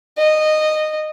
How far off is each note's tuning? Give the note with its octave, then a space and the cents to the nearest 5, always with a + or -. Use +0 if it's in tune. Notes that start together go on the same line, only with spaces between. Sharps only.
D#5 -15